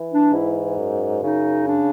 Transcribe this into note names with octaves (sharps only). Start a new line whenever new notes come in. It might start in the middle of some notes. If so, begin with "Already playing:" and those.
Already playing: E3
D4
G#2 E4
F#2
C#3 D#4
D4